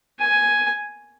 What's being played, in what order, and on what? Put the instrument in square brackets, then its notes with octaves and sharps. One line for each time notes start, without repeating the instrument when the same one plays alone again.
[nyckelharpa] G#5